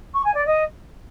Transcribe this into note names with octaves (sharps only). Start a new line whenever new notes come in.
C#6
G#5
D5
D#5